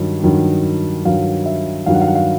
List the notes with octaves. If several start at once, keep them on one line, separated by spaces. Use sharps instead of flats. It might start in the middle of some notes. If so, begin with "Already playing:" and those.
Already playing: G2 D#3 F#3
G2 D#3 F#3
G2 D#3 F#3 F5
E5
G2 D#3 F#3 F5
F#5
F5
F#5
F5